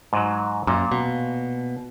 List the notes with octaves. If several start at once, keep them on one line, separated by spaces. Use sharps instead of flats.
G#2 F#3
F#2 A#2
B2